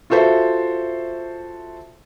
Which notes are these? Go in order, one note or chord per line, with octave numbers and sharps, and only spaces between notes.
F4 F#4 A4 C5 E5